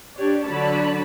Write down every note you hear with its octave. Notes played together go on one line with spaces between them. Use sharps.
D4 G4 C#5 D5
D3 F#3 C#5 D5 A5 B5